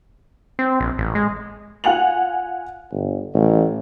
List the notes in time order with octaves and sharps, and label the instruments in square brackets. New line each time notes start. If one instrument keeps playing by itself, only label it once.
[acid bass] C4
A#1
A1
G#3
[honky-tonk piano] F4 F#5 G#5 F7 F#7
[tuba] G1
A1